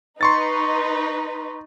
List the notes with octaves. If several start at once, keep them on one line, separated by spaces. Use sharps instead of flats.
D#4 B4 C6 C#6 A6